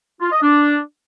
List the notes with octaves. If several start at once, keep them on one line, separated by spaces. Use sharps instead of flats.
F4
D#5
D4